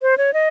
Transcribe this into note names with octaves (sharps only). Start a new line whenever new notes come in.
C5
C#5
D#5